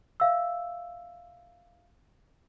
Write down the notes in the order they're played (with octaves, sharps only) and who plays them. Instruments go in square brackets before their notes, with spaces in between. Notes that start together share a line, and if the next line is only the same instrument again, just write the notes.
[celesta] E5 F5 E6